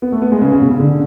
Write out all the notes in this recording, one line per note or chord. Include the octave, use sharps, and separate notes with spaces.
B3
A3
B3
G#3
C#3
C#3
B2
C#3
D3